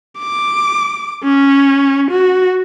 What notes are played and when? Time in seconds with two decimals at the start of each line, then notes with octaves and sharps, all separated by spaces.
0.19 D6
1.24 C#4
2.11 F#4